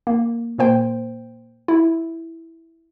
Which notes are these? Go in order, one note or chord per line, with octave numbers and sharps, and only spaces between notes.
A#3
A#2 A#3 C5 G5
E4